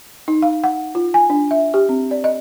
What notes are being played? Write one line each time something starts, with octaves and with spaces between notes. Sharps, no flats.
D#4
F5
F#5
F4
G#5
D4
E5
G4
C4
D5
D#5